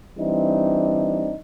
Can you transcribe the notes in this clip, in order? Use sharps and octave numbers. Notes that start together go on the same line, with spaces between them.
E3 G3 C4 D4 D#4